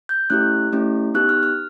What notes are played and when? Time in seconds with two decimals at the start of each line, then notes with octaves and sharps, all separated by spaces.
0.09 G6
0.30 A3 C#4 E4 G4 F#6
0.72 A3 C#4 E4 G4
1.14 B3 D#4 G4 F#6
1.29 F6
1.43 F6